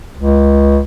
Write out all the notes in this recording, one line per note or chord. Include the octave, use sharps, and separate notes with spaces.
C#2